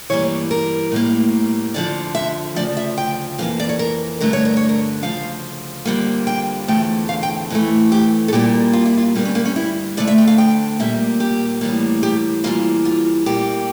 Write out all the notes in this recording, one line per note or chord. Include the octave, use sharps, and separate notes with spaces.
G2 E3 G3 A#3 C#5
A#4
A2 G3 A#3
F2 D3 F3 D5
E5
D2 C#3 F3 D5
E5
G5
F2 E3 A#3 F5
D5
C#5
A#4
G2 D3 A3 A#4
C#5
A#4
C#5
A#4
D2 C#3 F3 F5
F2 D3 G3 A#3
G5
E2 D3 F3 A3 G5
F5
G5
F2 E3 A3
G4
A4
A#2 G3 A#3 G4
F4
E4
F4
G2 D3 G3 A#3 C#4
C#4
A#3
C#4
E4
D2 D3 A3 D5
E5
G5
F5
G5
A#2 G3 A#3 E5
G4
A2 E3 G3 A#3
G4
F2 E3 G3 A#3 F4
F4
A#2 G3 A#3 G4